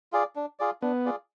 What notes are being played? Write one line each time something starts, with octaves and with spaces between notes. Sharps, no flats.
F4 G#4 D5
D4
F4 G#4 D5
B3 D4
F4 G#4 D5